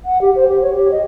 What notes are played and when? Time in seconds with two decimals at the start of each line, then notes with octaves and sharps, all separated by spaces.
0.05 F#5
0.21 G4
0.35 C5
0.48 G4
0.62 C#5
0.74 G4
0.91 D#5